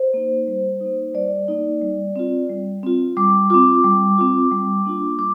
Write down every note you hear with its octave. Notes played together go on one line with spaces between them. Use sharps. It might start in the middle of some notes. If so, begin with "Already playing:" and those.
Already playing: C5
A#3 D#4
G3
A#3 D#4
G3 D5
A#3 D#4
G3
C4 F4
G3
C4 F4
G3 D6
C4 F4 D6
G3
C4 F4
G3
A#3 D4 F4
G3 D6